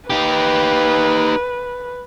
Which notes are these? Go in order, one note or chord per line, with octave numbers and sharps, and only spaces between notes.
D#4 G4 B4